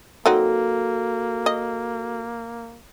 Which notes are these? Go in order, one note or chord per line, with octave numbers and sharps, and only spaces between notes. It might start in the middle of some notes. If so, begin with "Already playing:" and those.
F#3 A#3 C4 D#4 F#4 A4
D#5